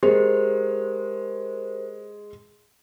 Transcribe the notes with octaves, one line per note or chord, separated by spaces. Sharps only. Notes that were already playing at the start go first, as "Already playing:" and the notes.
G#3 G4 A#4 C5